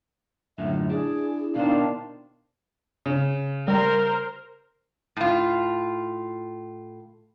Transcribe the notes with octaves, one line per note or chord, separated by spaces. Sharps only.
F#2 A2 D3 E5
D4 E4 G#4
B2 D#3 D4 C5 F5
C#3
G3 A#4 C5
A2 F4